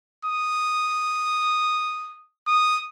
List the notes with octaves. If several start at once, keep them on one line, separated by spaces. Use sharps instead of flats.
D#6
D#6